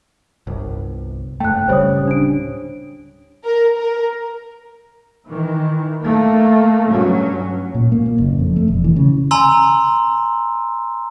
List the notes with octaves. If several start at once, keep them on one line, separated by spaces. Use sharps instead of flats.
G1 C2
F#1 A3 G5 F#6
D1 C#3 G3 C5 C#5 D#6
D4 D7
A#4
A#4
D#3 E3
A3 A#3
G2 F#3 C#4
A#2
A#3
A#2
F#1
F2
A3
E1
E3
C#3
G#5 A#5 C6 E6